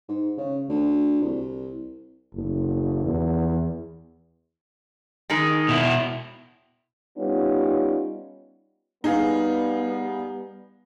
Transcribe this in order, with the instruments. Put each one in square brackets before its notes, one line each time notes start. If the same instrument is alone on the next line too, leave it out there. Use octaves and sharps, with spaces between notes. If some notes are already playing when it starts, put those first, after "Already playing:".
[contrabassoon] G#2
C#3
D2
C2
[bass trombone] F#1
E2
[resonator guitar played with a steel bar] D#3 G#3 D#4
[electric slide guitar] B2 E4
[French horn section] G3 B3 C#4 D#4 F4
[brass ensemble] G3 B3 [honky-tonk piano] D#4 G#4 F5